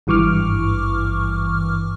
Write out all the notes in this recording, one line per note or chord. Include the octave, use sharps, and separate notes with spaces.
G#1 G2 E3 C#6 D6 F6